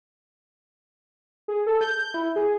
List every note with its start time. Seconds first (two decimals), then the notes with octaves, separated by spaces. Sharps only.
1.48 G#4
1.67 A4
1.81 G6
1.99 G6
2.14 E4
2.36 G#4